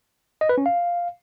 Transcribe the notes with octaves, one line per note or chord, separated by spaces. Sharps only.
D#5
B4
C#4
F5